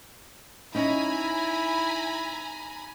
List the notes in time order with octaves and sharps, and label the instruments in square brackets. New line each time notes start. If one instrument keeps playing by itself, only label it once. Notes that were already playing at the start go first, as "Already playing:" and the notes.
[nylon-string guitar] C#4 D#4 [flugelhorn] E4 [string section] G#5 A#5 B5